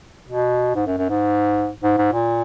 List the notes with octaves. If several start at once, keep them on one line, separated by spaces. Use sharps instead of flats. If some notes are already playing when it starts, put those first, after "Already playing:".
B2
G#2
F#2
F#2
G#2
G#2
G#2
A#2